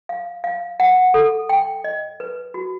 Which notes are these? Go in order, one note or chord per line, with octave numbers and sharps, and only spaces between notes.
F5
F5
F#5
A4
G5
D#5
B4
F#4